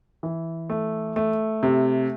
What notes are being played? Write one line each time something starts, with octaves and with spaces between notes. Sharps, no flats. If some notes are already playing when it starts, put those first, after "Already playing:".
E3
A3
A3
C3